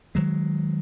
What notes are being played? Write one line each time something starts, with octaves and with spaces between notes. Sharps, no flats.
D#3 F#3 G#3